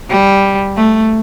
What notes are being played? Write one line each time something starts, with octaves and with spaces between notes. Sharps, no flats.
G3
A3